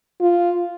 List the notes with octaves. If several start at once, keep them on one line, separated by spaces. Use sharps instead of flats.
F4